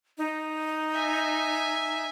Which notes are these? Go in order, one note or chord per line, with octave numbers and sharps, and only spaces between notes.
D#4
E5 G#5